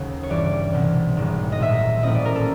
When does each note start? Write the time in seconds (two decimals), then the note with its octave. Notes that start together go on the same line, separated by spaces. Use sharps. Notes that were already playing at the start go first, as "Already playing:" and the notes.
Already playing: D#2 C#3 F#3
0.23 C#5
0.30 G2 E3 G3 D5
0.73 C2 B2 F#3
1.17 G#1 G#2 D#3 G3
1.52 D#5
1.59 A#2 F#3 A#3 E5
2.03 A2 F3 A#3 C#4 E4 D#5
2.15 D5
2.25 A#4
2.36 A4